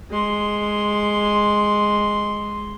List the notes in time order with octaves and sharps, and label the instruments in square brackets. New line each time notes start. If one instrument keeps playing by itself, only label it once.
[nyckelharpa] G#3 C6